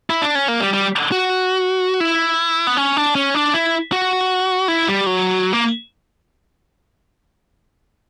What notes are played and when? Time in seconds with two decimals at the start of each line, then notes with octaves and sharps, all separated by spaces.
0.10 E4
0.22 D4
0.35 C#4
0.48 A#3
0.60 G3
0.73 G3
1.12 F#4
2.00 E4
2.67 B3
2.77 C#4
2.97 D4
3.15 C#4
3.35 D4
3.54 E4
3.92 F#4
4.68 E4
4.88 G3
5.06 F#3
5.53 A#3